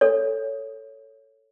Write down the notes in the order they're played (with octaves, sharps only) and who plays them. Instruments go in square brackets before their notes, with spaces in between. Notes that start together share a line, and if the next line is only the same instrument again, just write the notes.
[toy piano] A4 C#5